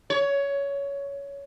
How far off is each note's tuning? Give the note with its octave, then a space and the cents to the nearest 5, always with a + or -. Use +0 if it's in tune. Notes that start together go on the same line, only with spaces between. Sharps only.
C#5 +15